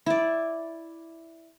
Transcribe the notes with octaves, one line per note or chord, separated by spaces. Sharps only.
E4 D5